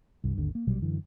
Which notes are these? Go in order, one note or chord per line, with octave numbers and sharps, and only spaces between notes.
C2 G2
G#1 D#2 D3
A#3
A#1 B2 F#3 G3
F#2 D3 E3